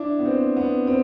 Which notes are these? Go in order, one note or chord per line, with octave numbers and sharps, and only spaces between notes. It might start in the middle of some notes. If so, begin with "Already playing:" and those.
Already playing: D4 E4
B3
C4
B3
C4